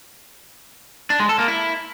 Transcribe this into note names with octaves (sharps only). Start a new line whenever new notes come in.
D4
G#3
A4
A#3
E4